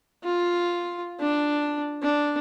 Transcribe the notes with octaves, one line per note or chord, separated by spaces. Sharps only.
F4
D4
D4